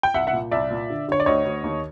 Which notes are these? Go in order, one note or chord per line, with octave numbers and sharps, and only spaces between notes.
G5
C2 E5 F#5
E5 F#5
A#2
C2 D5 E5
A#2
D3
D3 C#5
D5
D2 C#5 D#5
D2
D#2